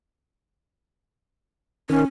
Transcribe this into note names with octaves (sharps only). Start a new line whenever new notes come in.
D#3 C#4